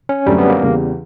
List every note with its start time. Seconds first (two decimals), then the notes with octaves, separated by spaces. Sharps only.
0.09 C#4
0.26 F#2 D3 F#3 G3 A3 C4
0.38 B3
0.50 A#3
0.61 E2 C#3 E3 G3